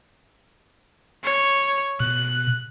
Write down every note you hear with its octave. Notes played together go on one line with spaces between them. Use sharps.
C#5
B2 F#6